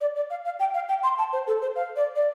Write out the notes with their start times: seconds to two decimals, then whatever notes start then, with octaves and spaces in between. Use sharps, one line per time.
0.01 D5
0.16 D5
0.30 F5
0.45 F5
0.60 G5
0.74 F5
0.89 G5
1.03 C6
1.18 A5
1.33 C5
1.47 A4
1.62 C5
1.76 F5
1.96 D5
2.16 D5